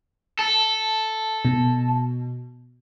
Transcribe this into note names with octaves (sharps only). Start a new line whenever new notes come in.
A4
B2